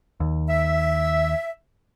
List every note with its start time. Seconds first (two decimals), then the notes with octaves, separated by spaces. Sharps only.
0.20 D#2
0.49 E5